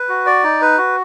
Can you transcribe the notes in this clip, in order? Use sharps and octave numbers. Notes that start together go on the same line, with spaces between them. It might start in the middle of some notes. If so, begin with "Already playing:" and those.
Already playing: B4
F#4
D5
D#4
B4
F#4